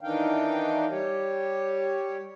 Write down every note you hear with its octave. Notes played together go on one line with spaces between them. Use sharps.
D#3 E3 D4 D#4 F5 G5
G3 G4 C#5